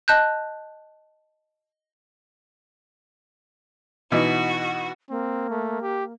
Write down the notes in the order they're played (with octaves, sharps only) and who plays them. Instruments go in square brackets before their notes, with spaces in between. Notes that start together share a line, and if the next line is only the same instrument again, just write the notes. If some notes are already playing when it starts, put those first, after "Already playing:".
[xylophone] D#5 A5 F#6 G6
[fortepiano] B2 E3 D#4 [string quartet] F#4
[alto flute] A#3 [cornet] C4
[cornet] A3
G4